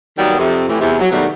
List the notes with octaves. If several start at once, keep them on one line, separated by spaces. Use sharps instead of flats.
D#3 F#3 G3 A#3 B3
F2 C3
A2 E3
E2 C3
F#3
B2 D#3 F#3 G3 A3